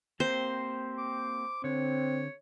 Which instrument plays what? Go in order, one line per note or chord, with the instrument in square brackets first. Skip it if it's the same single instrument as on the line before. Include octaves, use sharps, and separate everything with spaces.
[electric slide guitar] A#3 C4 G4 [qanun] C5
[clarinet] D6
[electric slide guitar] D3 [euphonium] C4 [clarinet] C#5